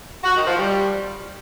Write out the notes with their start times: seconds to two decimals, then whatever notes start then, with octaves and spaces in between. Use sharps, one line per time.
0.24 F#4
0.35 D#3
0.47 F3
0.58 G3